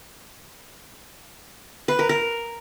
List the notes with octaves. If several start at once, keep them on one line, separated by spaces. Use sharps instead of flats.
B4
A#4
A#4